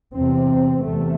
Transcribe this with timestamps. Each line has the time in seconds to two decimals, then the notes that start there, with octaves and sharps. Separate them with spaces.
0.13 E2 C3 C4
0.84 E2 C3 A3